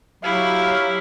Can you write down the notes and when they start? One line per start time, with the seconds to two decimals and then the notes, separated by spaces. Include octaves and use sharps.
0.24 F#3 E4 G4 F5